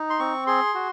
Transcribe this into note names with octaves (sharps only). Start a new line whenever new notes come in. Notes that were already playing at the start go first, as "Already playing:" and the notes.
Already playing: D#4
C6
C4 C#6
G#4 C6
F#4